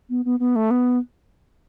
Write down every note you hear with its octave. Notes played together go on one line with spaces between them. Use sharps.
B3
B3
B3
A3
B3